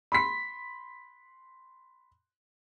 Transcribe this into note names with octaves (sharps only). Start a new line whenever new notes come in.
B5 C6 B6